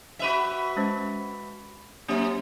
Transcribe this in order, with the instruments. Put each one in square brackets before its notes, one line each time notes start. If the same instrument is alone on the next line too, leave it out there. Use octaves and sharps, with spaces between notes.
[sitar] F#4 B4 E5
[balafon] G#3 C#4 C5
[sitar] F#2 C4 [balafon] A#3 G4 E5